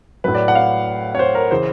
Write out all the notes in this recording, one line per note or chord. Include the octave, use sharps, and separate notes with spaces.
A2 F#3 B4
D5
F#5
F5
C#5
C5
A#4
C#3 E3 C5